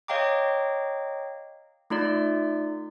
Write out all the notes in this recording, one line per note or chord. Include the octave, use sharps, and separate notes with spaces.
C#5 D#5 F5 G5 A#5 D6
A3 D#4 F4 D5